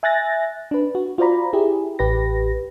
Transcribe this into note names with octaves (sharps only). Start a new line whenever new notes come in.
E5 G#5 F#6 A6 A#6
D4 B4
F#4
F4 F#4 C5 D5 A#5 B5
E4 G4 G#4
A1 G4 B4 A#6